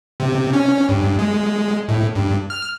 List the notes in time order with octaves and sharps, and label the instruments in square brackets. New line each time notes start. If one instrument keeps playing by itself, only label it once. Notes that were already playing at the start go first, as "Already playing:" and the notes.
[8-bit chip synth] C3
C#4
G2
G#3
A2
G2
F6